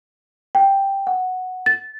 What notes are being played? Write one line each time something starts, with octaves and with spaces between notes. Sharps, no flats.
G5
F#5
A6